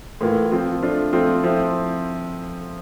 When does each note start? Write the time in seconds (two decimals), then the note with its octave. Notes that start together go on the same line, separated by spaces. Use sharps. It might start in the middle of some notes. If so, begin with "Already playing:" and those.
0.21 A2 E3 A#3 F4
0.51 F3 C4 F4
0.82 F3 A3 D4 F4
1.13 F3 A3 C4 F4
1.44 F3 A3 C4 E4